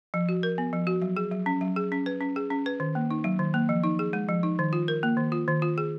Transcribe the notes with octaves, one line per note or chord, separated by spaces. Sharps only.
F3
F#4
A#4
B3
F3
F#4
F#3
G#4
F#3
C#4
F#3
G#4
C#4
B4
C#4
G#4
C#4
B4
D#3
A#3
D#4
F#3
D#3
A#3
F3
D#4
G#4
G#3
F3
D#4
D#3
F4
A#4
A#3
D#3
F4
D#3
F4
G#4